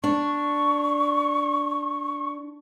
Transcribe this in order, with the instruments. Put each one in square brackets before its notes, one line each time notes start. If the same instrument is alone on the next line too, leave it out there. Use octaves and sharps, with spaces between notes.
[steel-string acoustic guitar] D4 [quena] C#6